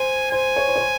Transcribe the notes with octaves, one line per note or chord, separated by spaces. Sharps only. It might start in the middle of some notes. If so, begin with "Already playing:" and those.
Already playing: C5 G#5
C5 G#5
C#5
C5
C#5
C5